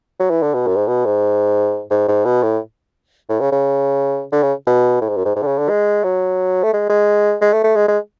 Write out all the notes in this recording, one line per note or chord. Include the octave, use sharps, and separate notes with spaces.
F#3
E3
D3
B2
F#2
G#2
B2
G#2
G#2
G#2
B2
A2
A2
C#3
C#3
D3
C#3
B2
A2
G#2
F#2
G#2
G#2
D3
C#3
D3
G#3
F#3
A3
G#3
G#3
G#3
A3
A3
G#3
G#3